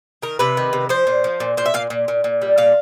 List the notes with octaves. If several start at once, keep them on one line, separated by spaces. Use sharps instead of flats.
D#3 A#4
C3 B4
D#3
C3
F3 C5
A#2
F3
A#2
A#2 C5
E5
A#2 F5
A#2
A#2
A#2
G3
A#2 F5